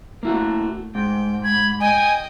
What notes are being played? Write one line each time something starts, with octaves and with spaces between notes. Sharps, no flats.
A3 A#3 E4 F#4
G#2 G5
B5 G#6
D#5 G5 G#5